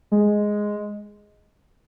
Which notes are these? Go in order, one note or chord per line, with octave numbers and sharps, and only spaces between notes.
G#3